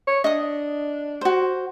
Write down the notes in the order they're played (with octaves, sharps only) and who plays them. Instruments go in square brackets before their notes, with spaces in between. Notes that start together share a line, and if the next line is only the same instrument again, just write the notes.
[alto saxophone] C#5
[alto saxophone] D4 [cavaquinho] D#5 D#6
[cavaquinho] F#4 C5